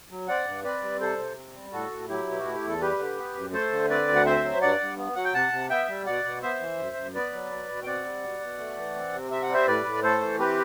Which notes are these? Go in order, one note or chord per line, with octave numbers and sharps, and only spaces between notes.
F#3
C4 D5 F#5
G2
C4 B4 D5
G3
C3 A4 C5
C3
C4
G3
A2 F#4 A4
A2
F#3 E4 G4
B2
F#4
A3
G4
E2 A4
G3 G4 B4
D3
B3
F#2
A3 A4 C5
D3
C4 B4 D5
D2
F#5
C4 C5 E5
F#3
G2 D5 F#5
G2
B3
F#3 F#5
G5
C3 F#5 A5
C3
B3 E5 G5
G3
B2 D5 F#5
B2
B3 C5 E5
E3
F#2
F#2
B3 B4 D5
F#3
B2
B2
G5
C4 D5 F#5
G3
B2
B2
A3
E3
C4
C3
C4 E5
F#5
G3 C5 E5
A2 B4 D5
A2
A3 A4 C5
E3
C4 G4 B4